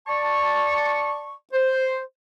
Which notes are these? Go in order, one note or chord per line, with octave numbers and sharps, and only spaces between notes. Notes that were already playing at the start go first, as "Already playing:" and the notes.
D5 A5 C#6
C5